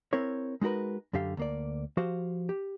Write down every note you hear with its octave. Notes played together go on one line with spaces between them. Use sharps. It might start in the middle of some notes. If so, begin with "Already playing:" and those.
C4 E4 A#4 C#5
G#3 D#4 F#4 A#4 B4
F#2 D3 G4 F5
D2 A#3 D5
F3 F#4 G4 C5 F5
G4